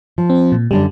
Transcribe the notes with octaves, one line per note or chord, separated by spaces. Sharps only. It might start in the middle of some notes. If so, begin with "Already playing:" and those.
F3
C4
A#2
F#2 D3 G3 D4